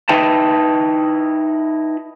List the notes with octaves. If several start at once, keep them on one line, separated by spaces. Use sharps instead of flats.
D#4 E4 B4 G5 A5